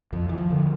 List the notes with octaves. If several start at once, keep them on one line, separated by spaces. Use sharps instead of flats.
F2 F3
E3
F3
D3